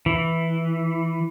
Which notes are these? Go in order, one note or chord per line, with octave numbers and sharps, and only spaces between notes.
E3